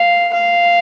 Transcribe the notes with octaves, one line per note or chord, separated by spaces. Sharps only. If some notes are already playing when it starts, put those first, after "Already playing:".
Already playing: F5
F5